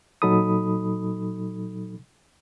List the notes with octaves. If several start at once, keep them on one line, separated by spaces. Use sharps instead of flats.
A#2 F#3 D#4 A4 B5 D#6